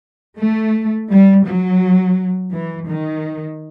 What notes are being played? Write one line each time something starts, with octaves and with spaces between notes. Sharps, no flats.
A3
G3
F#3
E3
D#3